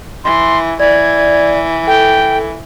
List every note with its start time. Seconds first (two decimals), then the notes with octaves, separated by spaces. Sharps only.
0.24 E3 C6
0.80 E3 D5 G#6
1.87 A4 G5